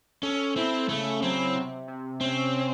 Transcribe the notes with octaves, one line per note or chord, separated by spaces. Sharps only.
C#4 A4
C4 E4
C#3 A3
F#3 C4
C3
C3
C4 C#4
C#4